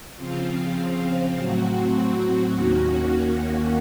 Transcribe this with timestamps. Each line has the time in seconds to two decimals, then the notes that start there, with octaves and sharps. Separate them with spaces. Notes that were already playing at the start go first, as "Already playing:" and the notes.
0.16 C#3 F3 C4 F4
1.35 A2 F#3 C4 F#4
2.53 D#2 D#3 A#3 C#4 F#4